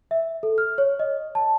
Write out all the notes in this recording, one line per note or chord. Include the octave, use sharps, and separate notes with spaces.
E5
A4
F6
C#5
D#5
A5